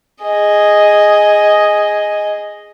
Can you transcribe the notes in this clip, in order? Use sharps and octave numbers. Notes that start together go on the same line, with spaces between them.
G#4 D#5